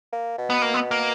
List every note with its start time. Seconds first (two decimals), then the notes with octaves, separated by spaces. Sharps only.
0.13 A#3
0.38 B2
0.50 B3
0.62 A#3
0.74 B3
0.91 A#3